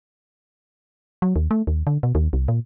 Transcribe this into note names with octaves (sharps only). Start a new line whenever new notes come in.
F#3
D#2
A3
D#2
D3
B2
D#2
C2
A#2